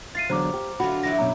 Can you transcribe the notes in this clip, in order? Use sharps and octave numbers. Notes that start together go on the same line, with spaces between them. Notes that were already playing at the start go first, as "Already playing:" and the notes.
F4 A6 C7 D#7
E2 D3 F#3 C5 A#5 D6
G4
D3 F#3 F4 F#4 B5
F#3 E4 G4 A#6
F#2 B2 A#5